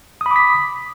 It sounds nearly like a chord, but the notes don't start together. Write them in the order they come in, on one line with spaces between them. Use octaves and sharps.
D#6 B5 D6 B6